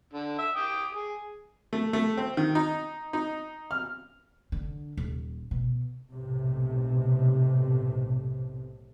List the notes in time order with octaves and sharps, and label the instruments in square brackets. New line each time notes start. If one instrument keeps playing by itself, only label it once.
[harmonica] D3
E5
G5 D6 D#6
G#4
[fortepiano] A3
A3
C4
D#3
D#4
D#4
F6
[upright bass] D3
D#1
B2
[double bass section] B1 A2 C3